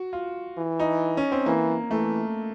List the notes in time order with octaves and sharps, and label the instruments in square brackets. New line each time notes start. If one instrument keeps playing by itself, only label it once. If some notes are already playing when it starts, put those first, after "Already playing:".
Already playing: [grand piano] F#4
F4
[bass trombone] E3
[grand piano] D#4
C#4
C4
[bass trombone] E3 [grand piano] A#3
[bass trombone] E3 [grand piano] A3